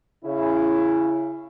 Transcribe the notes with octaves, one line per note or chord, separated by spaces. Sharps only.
C#3 E4